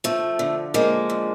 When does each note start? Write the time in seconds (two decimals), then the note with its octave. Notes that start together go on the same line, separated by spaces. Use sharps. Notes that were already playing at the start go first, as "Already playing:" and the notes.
0.04 F3 A3
0.39 D3
0.74 F3 G#3 A#3
1.10 D3